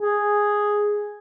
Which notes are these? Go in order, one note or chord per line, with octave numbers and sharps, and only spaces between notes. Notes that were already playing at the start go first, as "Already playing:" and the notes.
G#4